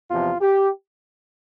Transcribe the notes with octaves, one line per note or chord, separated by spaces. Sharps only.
E2 C3 F3 F4
G4